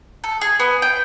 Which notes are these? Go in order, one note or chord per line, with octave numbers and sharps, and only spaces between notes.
A4
G#4
B3
G5